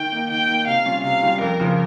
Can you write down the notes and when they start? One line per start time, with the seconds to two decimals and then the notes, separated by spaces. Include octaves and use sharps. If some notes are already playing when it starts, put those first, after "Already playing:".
Already playing: D#3 G5
0.12 A#3 D#4
0.30 D#3 G5
0.49 A#3 D#4
0.67 C3 F5
0.85 G3 C#4 F4
1.04 C3 F5
1.22 G3 C#4 F4
1.41 F2 A#4
1.60 C#3 F3